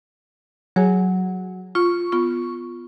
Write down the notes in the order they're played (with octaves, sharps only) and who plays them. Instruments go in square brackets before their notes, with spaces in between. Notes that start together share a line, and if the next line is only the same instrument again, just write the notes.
[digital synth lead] F#3 [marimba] G#4 C#5 G#5
[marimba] F4 [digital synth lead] C#6
[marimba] B3 F4